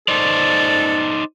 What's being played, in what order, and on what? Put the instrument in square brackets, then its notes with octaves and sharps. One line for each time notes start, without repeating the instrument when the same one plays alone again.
[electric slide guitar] D#4 C5 D5 [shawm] A4